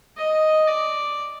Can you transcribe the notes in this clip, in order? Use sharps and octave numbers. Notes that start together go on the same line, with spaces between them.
D#5
D5